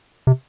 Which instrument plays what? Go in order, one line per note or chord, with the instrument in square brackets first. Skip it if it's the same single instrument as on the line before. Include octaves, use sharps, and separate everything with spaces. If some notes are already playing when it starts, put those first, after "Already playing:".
[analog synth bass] C3